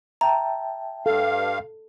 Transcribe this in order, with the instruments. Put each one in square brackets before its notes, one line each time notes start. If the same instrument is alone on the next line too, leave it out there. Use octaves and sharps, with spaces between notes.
[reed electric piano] E5 G5 A5 [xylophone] A#5
[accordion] G2 F5 [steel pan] A4